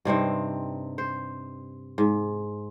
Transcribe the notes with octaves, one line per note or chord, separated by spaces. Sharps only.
G2 C3 C4 D#4
C5
G#2